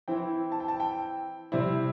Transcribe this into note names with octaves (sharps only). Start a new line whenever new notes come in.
E3 C4 E4 G5
A5
G5
A5
G5
C3 G3 C4 E4